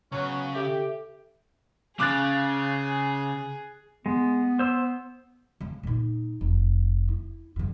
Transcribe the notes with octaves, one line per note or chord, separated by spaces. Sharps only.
C#3 F#3 B3 C#4
G4 A4 E5
C#3 G#4 D6 F#6 A6
G#3 B3
C5 E6
C#3 G#3
A#2 D#4
F1
E4
G2 D3